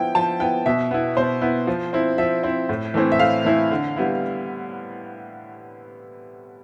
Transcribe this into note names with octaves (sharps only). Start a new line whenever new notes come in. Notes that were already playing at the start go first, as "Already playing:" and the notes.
Already playing: F3 B3 E4 G5
F3 A5
B3 E4 G5
B2 E5
B3 E4
B2 C5
B3 E4
F3
C4 E4
F3 E5
C4 E4
A2
E3 A3 C4 E4
E5
A2 F5
E3 A3 C4 E4
D3
G3 B3 E4